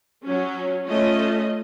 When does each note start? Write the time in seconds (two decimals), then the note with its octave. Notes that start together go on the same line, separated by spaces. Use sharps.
0.24 F#3 C#4
0.87 A3 C#4 F4 D#5